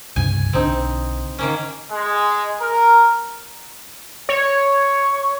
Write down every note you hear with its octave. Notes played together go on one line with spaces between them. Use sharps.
C#2 G2 C3 G#5
B1 D3 C4 D4 D#4
D#3 A#3 C#4
G#3
A#4
C#5